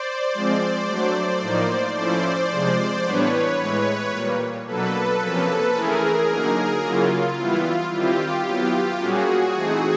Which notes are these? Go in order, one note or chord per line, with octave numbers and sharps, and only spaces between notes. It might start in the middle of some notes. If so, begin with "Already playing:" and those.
Already playing: C5 D5
F3 G#3 C4
F#3 A3 D4
A2 F3 A#3 D#4
F3 A3 C#4 E4 C5 D5
C3 F3 G#3
A2 E3 G3 B3 D4 B4 C#5
A2 E3 G#3
A#2 G3 A#3
B2 F#3 A#3 D4 A4 B4
C3 F3 A#3 C#4
E3 A3 C#4 E4 G#4 A#4
D3 F#3 A#3 D#4
C#3 F#3 A#3 C#4 E4 F4
E3 G3 B3 E4
D#3 G3 C4 E4 F4 G4
F#3 B3 E4
A#2 G3 A#3 C#4 F#4 G#4
E3 A3 C4 D#4